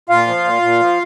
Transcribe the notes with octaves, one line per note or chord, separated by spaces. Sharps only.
A#2 F4 F5
F3
A#2
A#2
F3